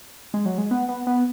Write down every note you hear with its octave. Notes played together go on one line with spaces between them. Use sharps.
G#3
F#3
G#3
B3
B3
B3